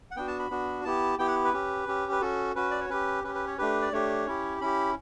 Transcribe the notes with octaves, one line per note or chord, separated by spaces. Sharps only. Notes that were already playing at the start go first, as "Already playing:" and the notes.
F#5
B3 D4 F#4 G5
A5
B5
B3 D4 F#4
B3 E4 G4 A5
B3 E4 G4 G5
F#5
B4
C#4 G4
C#4 G4
B4
C#4 F#4 A4
C#4 F#4 B4
D5
C#5
C#4 G4 B4
C#4 G4 B4
B4
C#5
A3 D4 G4 B4
D5
A3 D4 G4 C#5
C#4 E4 G4
C#4 E4 G4 B5